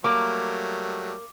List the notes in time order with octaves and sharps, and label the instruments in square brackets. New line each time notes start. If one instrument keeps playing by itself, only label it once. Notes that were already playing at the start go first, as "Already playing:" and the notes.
[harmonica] F#3 G3 A3 [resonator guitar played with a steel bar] A#3 [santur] D6